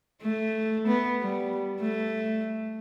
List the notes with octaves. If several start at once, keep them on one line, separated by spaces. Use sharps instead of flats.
A3
B3
G3
A3